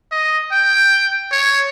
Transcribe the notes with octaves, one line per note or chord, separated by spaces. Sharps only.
D#5
G5
C#5